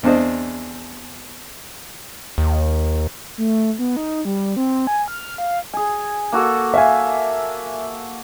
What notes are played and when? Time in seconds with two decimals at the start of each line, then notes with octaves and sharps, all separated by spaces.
0.03 E2 C4 D4 C5 D#5
2.38 D#2
3.37 A3
3.79 B3
3.97 D#4
4.25 G3
4.57 C4
4.87 G#5
5.08 F6
5.38 F5
5.73 G#4 G#5
6.32 A#3 F#4 A4
6.74 E5 F5 G#5